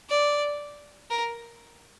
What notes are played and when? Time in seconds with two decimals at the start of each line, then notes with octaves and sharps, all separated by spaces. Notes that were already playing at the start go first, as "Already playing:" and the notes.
0.10 D5
1.10 A#4